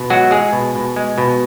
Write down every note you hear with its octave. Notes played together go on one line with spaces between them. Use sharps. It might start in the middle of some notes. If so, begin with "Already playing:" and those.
Already playing: B2
F#3 G#3 F#4
G#3 G#4
B2
B2
G#3
B2